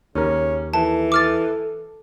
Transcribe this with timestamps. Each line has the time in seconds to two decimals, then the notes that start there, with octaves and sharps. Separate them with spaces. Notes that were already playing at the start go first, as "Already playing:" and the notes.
0.15 D#2 C#3 C#4 A#4
0.74 E3 A4 A5
1.12 A4 D6 F6 A6